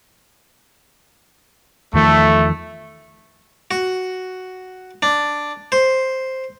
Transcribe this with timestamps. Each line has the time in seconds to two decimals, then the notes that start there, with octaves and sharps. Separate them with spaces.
1.94 E2 D#3 F3 A3
3.71 F#4
5.02 D4
5.72 C5